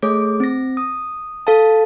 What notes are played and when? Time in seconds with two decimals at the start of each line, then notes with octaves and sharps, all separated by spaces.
0.02 A3 G#4 C#5 D6
0.40 C4 A#6
0.77 D#6
1.47 A4 F5 A5